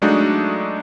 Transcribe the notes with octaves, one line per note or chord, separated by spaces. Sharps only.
F#3 G#3 A3 D4 D#4 F#4